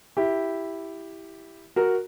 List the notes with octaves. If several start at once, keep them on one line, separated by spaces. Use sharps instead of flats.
E4 G4
F#4 A#4